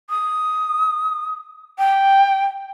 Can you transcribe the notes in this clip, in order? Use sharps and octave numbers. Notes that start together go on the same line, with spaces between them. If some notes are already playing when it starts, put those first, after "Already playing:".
D#6
G5